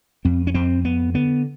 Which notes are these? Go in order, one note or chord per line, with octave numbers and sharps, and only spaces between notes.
F2 C4
C#4
F2 C4
F2 B3
D3 B3